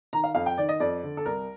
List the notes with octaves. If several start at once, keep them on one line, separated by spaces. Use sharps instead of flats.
D#3 A#5
F5
F2 F5
G5
D#3 D5
D#5
F2 D5
D3
A4
C2 A#4